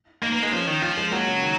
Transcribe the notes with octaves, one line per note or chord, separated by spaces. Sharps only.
A#3 D#4
A#3 B3
G#3 A#3
F3 C#4
D#3
F3 F4
G#3
F#3 A#3
C#3
D#3